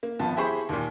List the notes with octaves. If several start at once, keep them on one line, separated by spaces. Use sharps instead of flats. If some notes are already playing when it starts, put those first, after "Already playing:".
A#3
G#1 F3 B3 A5
E4 G4 G#4 C5 B5 C#6
D#2 A#2